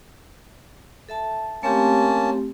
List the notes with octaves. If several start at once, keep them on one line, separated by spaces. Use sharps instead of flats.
A4 E5 A5
A3 A#3 C4 C#4 G4 A5